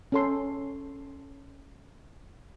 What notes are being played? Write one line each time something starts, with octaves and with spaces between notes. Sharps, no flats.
C#4 A4 C6